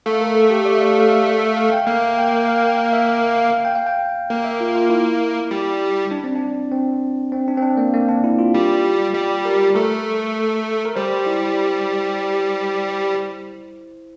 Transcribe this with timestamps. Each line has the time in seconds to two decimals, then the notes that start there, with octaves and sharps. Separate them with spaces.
0.06 A3 F5
0.21 A#4
0.35 A4
0.50 G4
0.65 D5
0.75 E5
0.81 F5
1.00 F5
1.11 E5
1.27 E5
1.42 F5
1.57 F5
1.72 G5
1.87 A#3 F5
2.18 G5
2.48 F5
2.62 G5
2.78 F5
2.93 E5
3.09 F5
3.24 F5
3.38 F5
3.65 G5
3.75 F5
3.87 G5
4.30 A#3
4.44 E5
4.60 F4
4.75 F4
4.90 E4
5.51 G3
6.11 D4
6.24 C4
6.35 D4
6.72 C4
7.32 C4
7.48 D4
7.58 C4
7.62 D4
7.77 A#3
7.94 A#3
8.09 D4
8.24 E4
8.39 F4
8.54 G3
9.14 G3 G4
9.45 A#4
9.74 A3 A#4
10.85 A#4
10.96 G3 C5
11.27 E4